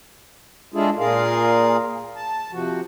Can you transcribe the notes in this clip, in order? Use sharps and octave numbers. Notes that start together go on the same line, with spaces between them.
G#3 D4 E4 F4 G#4 A4
A#2 F4 G#4 A#4 F5
A5
C3 F3 F#4